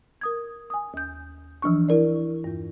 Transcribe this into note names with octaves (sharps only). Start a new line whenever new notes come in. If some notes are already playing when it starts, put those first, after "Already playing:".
A#4 D#6 G#6
G#5 D#6
D#2 G6
E3 F3 D4 C#6
E4 A#4 D5
E2 G2